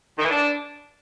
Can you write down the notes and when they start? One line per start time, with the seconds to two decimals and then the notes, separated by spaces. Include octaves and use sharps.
0.18 D#3
0.24 E3
0.30 D4